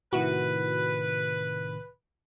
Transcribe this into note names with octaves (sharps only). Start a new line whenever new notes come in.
A2 C3 D#3 E4 F#4 B4